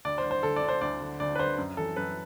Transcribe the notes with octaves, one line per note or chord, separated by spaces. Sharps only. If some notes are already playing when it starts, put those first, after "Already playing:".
D2 D5
C5
D3
C5
D2 A4
D5
D3
C5
D2 D5
D3
D2 D5
B4
D3 C5
F#2
E3 A4
F#2 B4